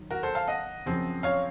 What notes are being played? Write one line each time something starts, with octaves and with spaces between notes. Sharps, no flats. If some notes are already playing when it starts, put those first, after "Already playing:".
Already playing: D#3 F#3
F#4 A#4
A4 C5
F5 A5
D#5 F#5
F#2 C#3 F3 C4
C#5 F5